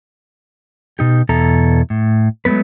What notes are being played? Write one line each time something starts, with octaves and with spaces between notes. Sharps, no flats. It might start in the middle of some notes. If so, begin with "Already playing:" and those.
B2 D#4 G4
E2 B2 E4 A4 A#5
A2
F#3 G#3 A3 B3 B4